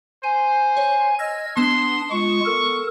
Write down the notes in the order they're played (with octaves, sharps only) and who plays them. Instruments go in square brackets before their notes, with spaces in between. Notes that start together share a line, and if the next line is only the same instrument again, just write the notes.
[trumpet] C5 [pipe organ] G#5
[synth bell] C#5
[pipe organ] D#5 [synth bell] E6 F6 G#6
[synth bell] B3 D#6 E7 [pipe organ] D4 [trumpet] C6
[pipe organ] G#3 F4 [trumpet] C#6
[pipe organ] A4 A#4